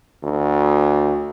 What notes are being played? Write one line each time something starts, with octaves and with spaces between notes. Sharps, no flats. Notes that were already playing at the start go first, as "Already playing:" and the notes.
D2